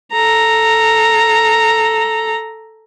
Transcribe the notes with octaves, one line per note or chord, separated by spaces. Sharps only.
A4 A#5